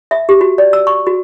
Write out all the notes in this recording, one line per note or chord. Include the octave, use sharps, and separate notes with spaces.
E5
G4
F#4
D5
E6
C#6
F#4